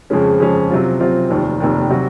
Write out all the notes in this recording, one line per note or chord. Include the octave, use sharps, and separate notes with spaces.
F2 C#3 F3 G#3 C#4
F2 C#3 F3 G#3 C#4
C3 F#3 C4 F4
C3 F#3 C4 F4
F1 D#2 D#3
F1 D#2 D#3
C3 F#3 C4 F#4